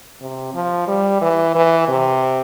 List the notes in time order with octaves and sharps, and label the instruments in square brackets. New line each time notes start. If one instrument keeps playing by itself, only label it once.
[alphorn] C3
F3
G3
E3
E3
C3